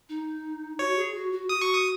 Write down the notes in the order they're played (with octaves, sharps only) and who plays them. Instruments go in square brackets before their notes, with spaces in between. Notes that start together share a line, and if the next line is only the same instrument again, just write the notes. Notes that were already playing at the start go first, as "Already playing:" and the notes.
[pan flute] D#4
[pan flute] F#4 [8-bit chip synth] C#5
[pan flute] G#4
F#4
F#4
[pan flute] F#4 [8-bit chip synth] D#6
[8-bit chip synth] C#6
D#6